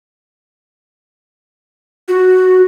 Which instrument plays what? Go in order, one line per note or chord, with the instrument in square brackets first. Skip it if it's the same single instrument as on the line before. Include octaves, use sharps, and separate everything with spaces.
[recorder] F#4